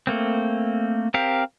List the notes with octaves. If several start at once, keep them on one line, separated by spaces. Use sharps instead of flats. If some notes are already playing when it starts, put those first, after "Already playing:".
A3 A#3 C4
C4 G4 A#4 F5